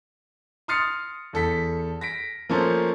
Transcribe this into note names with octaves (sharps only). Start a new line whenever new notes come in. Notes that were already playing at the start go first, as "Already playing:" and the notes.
C6 D#6 F6 A6 C7 C#7
E2 A4 B6
A#6 B6 D7
F3 A3 A#3 C#4 A4 C5